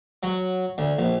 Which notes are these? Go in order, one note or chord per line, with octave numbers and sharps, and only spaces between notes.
F#3
D2
A#1